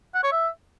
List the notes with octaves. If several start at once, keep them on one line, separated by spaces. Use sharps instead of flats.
F#5
C#5
E5